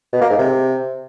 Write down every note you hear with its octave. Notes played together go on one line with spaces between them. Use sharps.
B2
A#3
G#2
C3